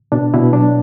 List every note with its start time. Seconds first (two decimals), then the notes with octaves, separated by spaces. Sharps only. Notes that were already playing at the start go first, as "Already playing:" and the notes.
0.12 B2 D4
0.34 B2 E4
0.53 F#3 D4